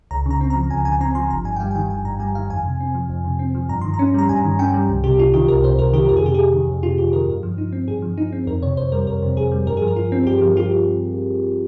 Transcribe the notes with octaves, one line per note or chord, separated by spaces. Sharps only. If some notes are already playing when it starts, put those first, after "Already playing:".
C#2 A#5
C#3 A#5
C4
A#5
F3
C#2 G#5
C#3 G#5
C4 A#5
F3 C6
G1 A#5
G2 G#5
G5
G3 F5
G#5
D#3 G5
G1 G#5
G2 A#5
G3 G#5
D#3 F5
F2 G#5
C3
C4
F3
F2
C3
C4
F3
G2 A#5
D#3 C6
A#5
C#4
G3 A#5
G2 G#5
D#3
C#4 G5
G3
C2
C3 G4
C2 F4
D#3 G4
C2 A#4
C3 C5
C2 A#4
D#3 G4
F2 A#4
G#4
C3 G4
F2 G#4
D#3
F2
C3 F4
F2 G4
D#3 A#4
G2
F3
D#4
C4
G2 G#4
F3
D#4
C4
F2 A#4
C3 C#5
F2 C5
G3 A#4
F2 A#4
C3
F2 G#4
G3
G2 A#4
G#4
F3
A#4
F4
C4
G2 G4
F3
F4 G4